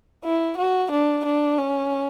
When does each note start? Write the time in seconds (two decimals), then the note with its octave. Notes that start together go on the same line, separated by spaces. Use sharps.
0.24 E4
0.57 F#4
0.91 D4
1.25 D4
1.58 C#4